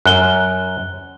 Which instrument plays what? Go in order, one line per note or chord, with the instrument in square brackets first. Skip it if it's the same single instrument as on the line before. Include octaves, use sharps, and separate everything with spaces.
[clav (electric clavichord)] F#2 [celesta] F#6 G7